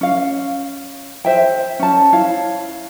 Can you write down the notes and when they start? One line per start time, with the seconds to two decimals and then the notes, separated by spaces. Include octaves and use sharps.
0.01 C#4 F5
1.25 C5 E5 G5
1.79 C#4 A5
2.13 E4 C#5 F5